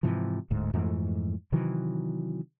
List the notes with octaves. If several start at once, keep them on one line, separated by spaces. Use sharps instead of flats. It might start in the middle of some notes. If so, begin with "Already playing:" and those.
G#2 C3 E3 F3
D1 D2 G#2
F2 G#2 E3 A3
C3 D#3 E3 F#3